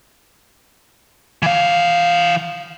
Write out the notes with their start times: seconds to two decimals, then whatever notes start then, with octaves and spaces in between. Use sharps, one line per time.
1.42 E3 F5